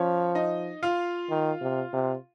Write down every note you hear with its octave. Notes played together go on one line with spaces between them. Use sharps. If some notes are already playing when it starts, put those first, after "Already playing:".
Already playing: F3 C#4 C#5
D#4 D#5
F4 F5
D#3
C3
C3